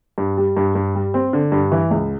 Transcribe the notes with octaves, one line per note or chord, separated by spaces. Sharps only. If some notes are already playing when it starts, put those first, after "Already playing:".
G2
G3
G2
G2
G3
C4
D3
G2
E3
C#2